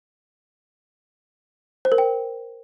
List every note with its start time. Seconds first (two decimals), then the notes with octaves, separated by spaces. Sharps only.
1.85 C5
1.92 A#4
1.98 G5